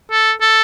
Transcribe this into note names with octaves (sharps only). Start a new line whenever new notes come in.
A4
A4